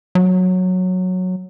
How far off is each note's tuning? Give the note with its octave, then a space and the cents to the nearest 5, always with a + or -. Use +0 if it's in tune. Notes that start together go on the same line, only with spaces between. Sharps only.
F#3 -10